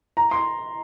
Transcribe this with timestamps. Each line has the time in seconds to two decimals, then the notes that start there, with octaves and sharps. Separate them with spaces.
0.17 A#5
0.31 C6